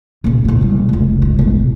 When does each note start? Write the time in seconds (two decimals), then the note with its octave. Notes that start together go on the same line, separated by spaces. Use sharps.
0.24 A#2 C#3
0.45 F#1 A#2
0.61 E1 G3
0.89 F1 C#2
1.22 G#2
1.39 E1 A1